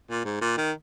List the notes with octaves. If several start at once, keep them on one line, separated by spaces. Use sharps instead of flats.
A#2
G#2
A#2
D#3